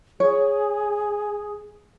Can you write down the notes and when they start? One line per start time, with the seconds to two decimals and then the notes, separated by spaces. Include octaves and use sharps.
0.20 G#4 C#5